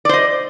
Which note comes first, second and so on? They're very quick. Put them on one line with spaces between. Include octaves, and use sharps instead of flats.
D5 C5 D#5